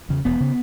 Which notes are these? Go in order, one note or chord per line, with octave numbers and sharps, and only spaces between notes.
E2 C#3
E1 B3
C#3